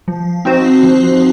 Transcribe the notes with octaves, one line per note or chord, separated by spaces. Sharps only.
F3
C4 D#4 F#4 C5
F3